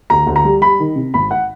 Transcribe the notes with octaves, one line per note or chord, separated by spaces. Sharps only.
D2 A#5
D2
A#5
G3
G3 B5
D#3
C3
G#1 B5
F#5